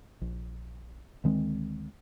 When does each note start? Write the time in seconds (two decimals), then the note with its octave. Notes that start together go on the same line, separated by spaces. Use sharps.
0.21 A#1
1.24 D2 D#3 G#3 C4